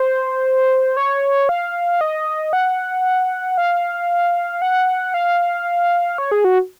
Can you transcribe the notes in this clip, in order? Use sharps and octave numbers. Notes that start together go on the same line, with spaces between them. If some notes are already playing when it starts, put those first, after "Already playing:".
Already playing: C5
C#5
F5
D#5
F#5
F5
F#5
F5
C#5
G#4
F#4